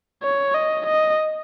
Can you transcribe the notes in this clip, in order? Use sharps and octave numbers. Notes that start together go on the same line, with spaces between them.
C#5
D#5
D#5